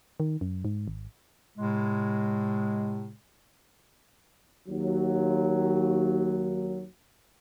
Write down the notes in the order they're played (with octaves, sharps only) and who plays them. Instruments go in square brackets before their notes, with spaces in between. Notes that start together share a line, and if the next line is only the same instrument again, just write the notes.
[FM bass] D#3
F#2
G#2
G#1
[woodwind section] A2 C3 G#3
[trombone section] D#2 F#3